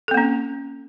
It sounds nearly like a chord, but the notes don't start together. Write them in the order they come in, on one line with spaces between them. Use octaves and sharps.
A4 C4 A#3 C#4